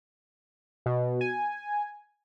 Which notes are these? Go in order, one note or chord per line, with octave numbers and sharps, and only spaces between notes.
B2
G#5